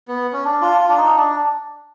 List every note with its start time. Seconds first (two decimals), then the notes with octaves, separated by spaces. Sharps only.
0.08 B3
0.33 C#4
0.45 D4
0.62 F4
0.80 F4
0.89 D4
0.97 D#4
1.16 D4